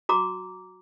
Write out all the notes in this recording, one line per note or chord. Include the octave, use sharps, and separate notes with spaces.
F#4 A#5 D6